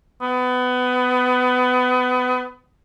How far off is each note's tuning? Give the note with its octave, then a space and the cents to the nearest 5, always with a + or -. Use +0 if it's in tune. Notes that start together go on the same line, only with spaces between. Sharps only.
B3 +25